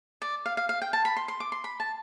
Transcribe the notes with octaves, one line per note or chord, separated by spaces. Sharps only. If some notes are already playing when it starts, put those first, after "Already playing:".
D5
F5
F5
F5
G5
A5
B5
C6
C6
D6
C6
B5
A5